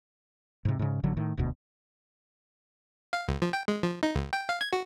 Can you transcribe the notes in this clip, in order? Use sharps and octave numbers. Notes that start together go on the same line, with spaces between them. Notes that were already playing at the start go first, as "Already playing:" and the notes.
G#2 C3
G#2 C#3
A1 D3 F#3
A2 D#3
E1 D2 B2
F5
C#2
F3
G5
G#3
F3
D#4
C#2
G5
F5
G#6
F#4